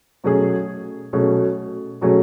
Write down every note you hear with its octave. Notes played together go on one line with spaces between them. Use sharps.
B2 F#3 A3 C#4 G#4
B2 F#3 A3 C#4 G#4
B2 F#3 A3 C#4 G#4